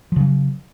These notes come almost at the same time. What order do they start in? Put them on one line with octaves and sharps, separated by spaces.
F3 C#3 F#3